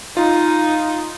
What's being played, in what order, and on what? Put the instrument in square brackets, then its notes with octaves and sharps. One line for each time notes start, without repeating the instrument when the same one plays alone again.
[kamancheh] D#4 [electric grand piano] F4